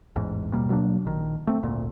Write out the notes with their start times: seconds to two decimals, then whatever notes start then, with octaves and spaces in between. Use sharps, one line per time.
0.16 A1 E2 G#2
0.53 D#2 B2 G3 A#3
0.69 B2 F#3 A#3 D4
1.05 A#1 D#3
1.47 A3 C4
1.63 G#1 D2 A#2